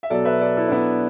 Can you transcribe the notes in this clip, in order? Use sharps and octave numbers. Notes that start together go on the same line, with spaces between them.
E5
B2 F#3 A4 D5
B4 E5
A4 D5
E4 A4
D4
B3 E4